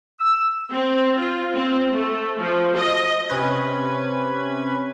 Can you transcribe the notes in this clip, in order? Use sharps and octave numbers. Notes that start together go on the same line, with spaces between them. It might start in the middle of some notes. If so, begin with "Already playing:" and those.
E6
C4
F4
C4
A3
F3
D#5
C3 C#4 B4 G#6